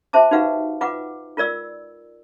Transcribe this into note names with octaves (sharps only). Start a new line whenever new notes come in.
F#4 C5 E5 A5 D6
D#4 F#4 G4 B4 F5 F#5
F4 B4 F#5 D6
F4 A#4 D5 E6